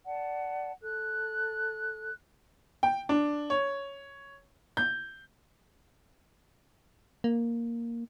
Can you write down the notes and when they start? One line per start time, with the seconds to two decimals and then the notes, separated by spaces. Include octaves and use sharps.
0.06 D5 F#5 A5
0.82 A4 F#6
2.83 G5
3.09 D4
3.50 C#5
4.77 G6
7.24 A#3